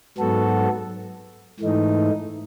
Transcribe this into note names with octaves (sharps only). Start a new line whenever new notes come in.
G#2 F#3 B3 F#4 A4
G#2 E3 A3 D#4